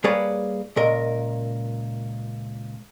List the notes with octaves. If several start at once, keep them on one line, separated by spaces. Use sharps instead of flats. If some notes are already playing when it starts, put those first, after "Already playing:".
G3 A#3 G#4 B4 C#5 D5
C#2 A#2 A#4 D#5